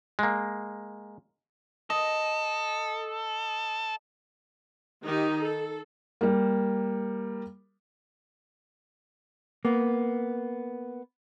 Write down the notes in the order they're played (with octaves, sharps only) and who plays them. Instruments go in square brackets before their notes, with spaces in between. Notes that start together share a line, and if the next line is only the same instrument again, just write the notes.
[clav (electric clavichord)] G#3 A#3
[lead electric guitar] A4 [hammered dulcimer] D#5
[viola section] D#3 D#4 G4
A4
[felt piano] G3 A#3
[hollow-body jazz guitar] A#3 B3